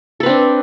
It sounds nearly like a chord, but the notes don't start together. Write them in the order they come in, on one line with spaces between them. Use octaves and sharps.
A4 B4 C4 D4